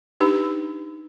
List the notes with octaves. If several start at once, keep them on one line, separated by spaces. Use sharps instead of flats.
D4 D#4 G4 B4